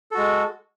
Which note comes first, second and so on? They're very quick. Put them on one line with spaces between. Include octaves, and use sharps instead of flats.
A4 F#4 G#3